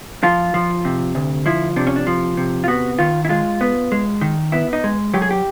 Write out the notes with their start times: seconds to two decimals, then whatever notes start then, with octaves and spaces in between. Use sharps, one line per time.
0.23 F3 F4
0.54 F3
0.85 C3
1.15 D2
1.46 F3 E4
1.76 C3 D4
1.87 C#4
1.96 D4
2.07 F3
2.37 C3
2.64 F4
2.68 B3 F#4
2.99 D#3 F4
3.25 E4
3.29 G#3 F4
3.61 B3
3.92 G#3
4.21 D#3
4.52 B3 E4
4.73 D#4
4.84 G#3
5.13 F#3 G4
5.22 G#4
5.31 G4